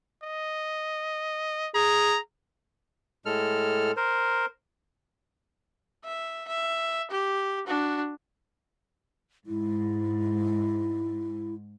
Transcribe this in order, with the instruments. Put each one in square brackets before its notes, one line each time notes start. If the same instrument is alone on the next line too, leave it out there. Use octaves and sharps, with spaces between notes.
[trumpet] D#5
[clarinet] G#4 [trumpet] A#5
[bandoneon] A2 G#3 A4 F6
A#4 C5
[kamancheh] E5
E5
G4
D4 F#4
[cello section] G#2 [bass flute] E4